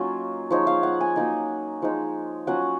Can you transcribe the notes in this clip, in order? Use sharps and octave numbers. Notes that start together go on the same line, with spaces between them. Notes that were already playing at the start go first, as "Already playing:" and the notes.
Already playing: F#3 A#3 C#4 D#4 F4 C#6
F3 G#3 D#4 C#5
F5
F#5
G#5
F#3 A#3 D#4
F3 G#3 D#4
F#3 C#4 F4 F#5